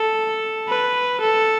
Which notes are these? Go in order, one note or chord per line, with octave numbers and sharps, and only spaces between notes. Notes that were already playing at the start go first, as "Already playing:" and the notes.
Already playing: A4
B4
A4